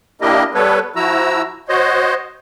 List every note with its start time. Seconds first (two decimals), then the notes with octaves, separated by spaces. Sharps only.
0.21 A#3 D4 E4 G4 A#4 D#5
0.54 G3 B3 A4 B4 C#5
0.96 F3 E4 F#4 A#5 E6
1.69 F#4 C5 C#5 D#5